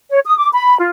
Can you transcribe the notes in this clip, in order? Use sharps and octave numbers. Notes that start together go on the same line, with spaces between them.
C#5
D#6
D6
B5
F4